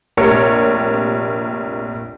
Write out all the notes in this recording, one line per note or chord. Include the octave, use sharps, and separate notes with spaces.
F1 A#1 G4 A#4 C#5 C#7